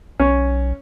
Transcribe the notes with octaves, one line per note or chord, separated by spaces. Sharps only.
B1 C#4